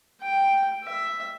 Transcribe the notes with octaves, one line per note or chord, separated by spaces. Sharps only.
G5
E5